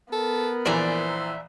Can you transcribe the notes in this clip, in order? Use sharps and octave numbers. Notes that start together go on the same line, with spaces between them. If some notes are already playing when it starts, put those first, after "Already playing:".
B3 A4 A#4
A#1 E3 C5 D5 E5 G#5 A#5